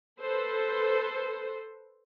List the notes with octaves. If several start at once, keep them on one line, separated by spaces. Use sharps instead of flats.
A4 B4 C5